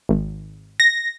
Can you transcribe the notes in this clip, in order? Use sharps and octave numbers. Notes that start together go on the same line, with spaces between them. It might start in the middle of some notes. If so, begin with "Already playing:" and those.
G#1
A#6